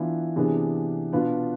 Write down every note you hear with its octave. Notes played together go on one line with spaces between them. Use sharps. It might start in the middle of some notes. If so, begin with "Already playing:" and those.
Already playing: E3 B3 D4 F4
C3 E3 B3 D4 G#4
B2 B3 D4 F4 B4